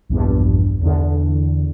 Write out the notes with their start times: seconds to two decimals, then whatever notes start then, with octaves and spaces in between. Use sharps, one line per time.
0.09 A#1 E2 G2
0.82 E2 D3